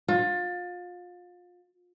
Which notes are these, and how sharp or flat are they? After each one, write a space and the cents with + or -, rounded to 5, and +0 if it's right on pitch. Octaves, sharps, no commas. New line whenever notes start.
F4 +30